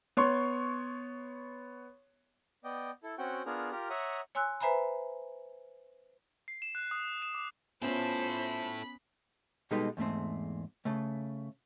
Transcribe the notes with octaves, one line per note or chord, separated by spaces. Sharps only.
B3 C#5 C6 C#6
B3 D5 D#5 G5
E4 A4
C4 C#4 F#4 F#5 G5
B3 D4 F4 G#4 A#4
F4 G4 A#4
C#5 E5 F#5 A#5 D#6
C#5 G#5 C6 E6 F#6
B4 C5 E5 G#5 A#5 B5
C7
E7
F#6
D#6
E7
D6
B3 C#4 E4 F4 A4 C5 B5
B2 G3 G#3 D#4 A4 B4
E2 G#2 A3 C4
C#3 A3